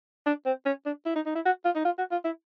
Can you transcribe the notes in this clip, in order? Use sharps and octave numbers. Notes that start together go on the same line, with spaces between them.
D4
C4
C#4
D4
E4
D#4
D#4
E4
F#4
F4
D#4
F4
F#4
F4
E4